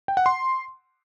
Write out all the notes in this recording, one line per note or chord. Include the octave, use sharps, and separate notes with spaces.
G5
F#5
C6